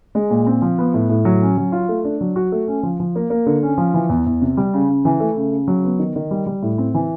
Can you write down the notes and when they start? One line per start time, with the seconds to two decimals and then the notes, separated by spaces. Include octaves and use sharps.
0.15 G#3
0.30 A#2
0.47 C4
0.62 F3
0.78 B3
0.94 A2
1.09 A2
1.25 F#3
1.41 C#4
1.57 F#3
1.72 F4
1.89 A3
2.04 D4
2.21 F#3
2.36 F#4
2.52 A3
2.68 C#4
2.83 F3
3.00 F3
3.15 A#3
3.30 A#3
3.46 D3
3.63 C#4
3.78 F3
3.94 E3
4.09 E2
4.26 E2
4.42 C3
4.57 G3
4.74 C#3
4.89 C#3
5.05 E3
5.20 A3
5.36 C#3
5.52 C#3
5.68 F#3
5.84 B3
5.99 D#3
6.16 D#3
6.31 G3
6.46 G3
6.62 A2
6.78 C4
6.94 E3